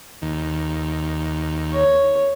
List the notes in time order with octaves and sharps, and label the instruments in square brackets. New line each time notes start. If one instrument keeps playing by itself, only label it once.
[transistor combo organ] D#2
[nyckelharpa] C#5